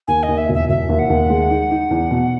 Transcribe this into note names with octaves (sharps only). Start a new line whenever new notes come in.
D#2 G#5
D#5
D#2
E5
E1
E5
E1 E5
D#2
F#5
D#2
G#3
D#4
D#4
E2
B2